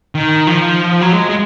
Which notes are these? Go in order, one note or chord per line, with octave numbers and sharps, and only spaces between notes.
D#3
F3
F#3
G#3
G#3